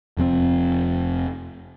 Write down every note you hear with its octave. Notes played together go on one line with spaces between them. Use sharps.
F1 F2 C3 C4